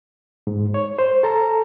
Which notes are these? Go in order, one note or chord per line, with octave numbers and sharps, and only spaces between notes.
G#2
C#5
C5
A4 A5 A#5